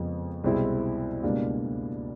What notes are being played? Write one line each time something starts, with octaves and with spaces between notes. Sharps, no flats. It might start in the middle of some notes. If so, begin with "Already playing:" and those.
Already playing: F2 C#3 F3 G#3 B3
C2 B2 G#3 C4 E4
C#2 B2 G3 A#3 D4